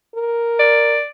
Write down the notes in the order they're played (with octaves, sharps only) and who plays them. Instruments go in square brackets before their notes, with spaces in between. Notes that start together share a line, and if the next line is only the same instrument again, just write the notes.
[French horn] A#4
[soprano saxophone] D5